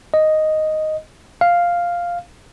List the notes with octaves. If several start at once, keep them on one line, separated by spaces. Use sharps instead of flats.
D#5
F5